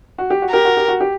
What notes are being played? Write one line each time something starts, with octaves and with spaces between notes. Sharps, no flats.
F#4
G4
F#4
G4 A#4
F#4
G4
F#4
G4